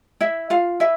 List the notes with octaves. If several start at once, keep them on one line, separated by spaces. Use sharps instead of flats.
E4 E5
F4 F5
E4 E5